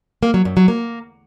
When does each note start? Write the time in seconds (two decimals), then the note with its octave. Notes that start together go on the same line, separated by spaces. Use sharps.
0.23 A#3
0.34 F#3
0.45 F#2
0.57 F#3
0.68 A#3